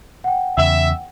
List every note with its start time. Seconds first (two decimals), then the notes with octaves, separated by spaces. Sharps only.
0.24 F#5 G5
0.58 E2 C#3 E5